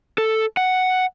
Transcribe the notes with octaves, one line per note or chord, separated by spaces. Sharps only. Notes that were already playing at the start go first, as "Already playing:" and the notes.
A4
F#5